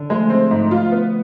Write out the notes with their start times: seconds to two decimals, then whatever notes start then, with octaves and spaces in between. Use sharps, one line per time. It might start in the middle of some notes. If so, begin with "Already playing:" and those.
Already playing: D3
0.09 F3 G#3 A3
0.30 C4
0.51 G#2
0.71 F4
0.91 B3